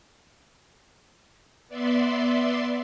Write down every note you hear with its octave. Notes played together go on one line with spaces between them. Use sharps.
B3 D5 E5 C6